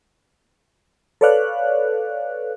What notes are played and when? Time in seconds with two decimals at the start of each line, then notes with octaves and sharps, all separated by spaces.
1.21 A4 B4 C#5 D5 F5 F#6